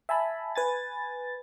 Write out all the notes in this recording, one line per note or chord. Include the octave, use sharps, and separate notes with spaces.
E5 G#5 A5 B5
B4 G#5 A6